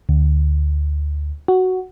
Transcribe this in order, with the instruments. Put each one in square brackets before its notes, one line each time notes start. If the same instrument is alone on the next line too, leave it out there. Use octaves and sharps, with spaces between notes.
[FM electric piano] D2
F#4